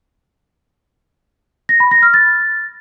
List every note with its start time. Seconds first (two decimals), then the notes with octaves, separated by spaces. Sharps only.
1.69 A#6
1.80 B5
1.91 A#6
2.03 F6
2.14 A6